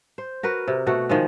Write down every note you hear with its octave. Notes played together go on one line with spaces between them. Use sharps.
C5
F#4 A#4 B4
C3
B2 A3 F#4
D#3 F3 G#3